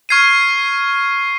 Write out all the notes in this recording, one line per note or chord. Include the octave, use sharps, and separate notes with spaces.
C#6 F6 G#6 C7 D#7